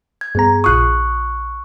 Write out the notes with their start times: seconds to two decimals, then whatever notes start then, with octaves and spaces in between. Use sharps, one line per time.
0.21 G#6
0.35 G2 B3 G#4 A#5
0.64 A#1 F4 C#6 D#6 F#6